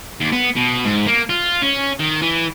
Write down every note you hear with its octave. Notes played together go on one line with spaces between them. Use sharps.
D#2
B3
B2
G#2
A#3
F4
C#4
D#3
E3